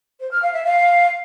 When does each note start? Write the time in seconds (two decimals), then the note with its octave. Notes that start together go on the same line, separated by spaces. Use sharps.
0.20 C5
0.31 F6
0.42 F5
0.53 E5
0.64 F5